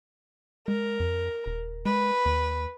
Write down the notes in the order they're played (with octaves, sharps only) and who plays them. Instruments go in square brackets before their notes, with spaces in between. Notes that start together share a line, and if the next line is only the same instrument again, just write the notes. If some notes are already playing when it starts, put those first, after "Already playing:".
[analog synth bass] G#3 [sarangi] A#4
[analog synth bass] F2
D#1
[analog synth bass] G#3 [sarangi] B4
[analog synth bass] D#2